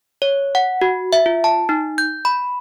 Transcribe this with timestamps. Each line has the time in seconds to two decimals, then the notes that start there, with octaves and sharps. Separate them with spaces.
0.22 C#5
0.55 F#5
0.81 F#4
1.13 E5
1.26 F4
1.44 A5
1.69 D#4
1.98 G6
2.25 B5